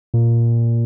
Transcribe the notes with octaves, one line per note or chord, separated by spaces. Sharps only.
A#2